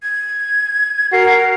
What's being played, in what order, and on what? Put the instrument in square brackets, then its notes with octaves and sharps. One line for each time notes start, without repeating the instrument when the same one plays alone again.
[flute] G#6
[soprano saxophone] F#4 [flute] A#4 [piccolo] C7